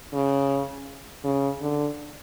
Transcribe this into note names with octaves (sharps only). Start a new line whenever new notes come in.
C#3
C#3
D3